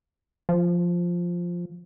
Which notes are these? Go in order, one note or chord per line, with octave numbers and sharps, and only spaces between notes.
F3